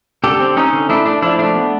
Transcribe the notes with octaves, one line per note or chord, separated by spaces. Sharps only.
D3 G4 A4
C4
C4 C#4 D#4
D3
A3 D4 E4
A3 D4
F3 D4 E4
A3 D4
B3